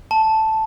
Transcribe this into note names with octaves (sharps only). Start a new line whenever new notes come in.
A5